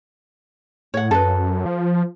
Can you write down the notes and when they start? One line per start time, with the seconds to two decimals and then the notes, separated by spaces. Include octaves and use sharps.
0.94 A2 C#5 F#5
1.11 F#2 A4 B4
1.66 F3